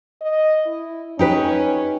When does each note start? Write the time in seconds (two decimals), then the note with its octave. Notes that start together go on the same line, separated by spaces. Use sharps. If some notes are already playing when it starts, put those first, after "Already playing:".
0.21 D#5
0.66 E4
1.19 C#4 D#4 G4 B4